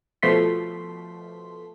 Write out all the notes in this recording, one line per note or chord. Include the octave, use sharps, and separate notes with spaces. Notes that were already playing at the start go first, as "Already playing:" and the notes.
B2 F3 A3 C6 B6